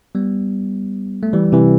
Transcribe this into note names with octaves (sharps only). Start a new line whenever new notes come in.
G3 B3
A3
E3 G3
C3 E3